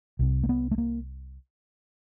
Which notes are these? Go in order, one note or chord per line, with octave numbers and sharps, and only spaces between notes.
C2 C3
A#3
B3
A3
A#3